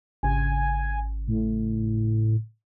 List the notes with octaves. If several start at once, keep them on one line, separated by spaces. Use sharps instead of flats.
G#1 C#3 G#5
A2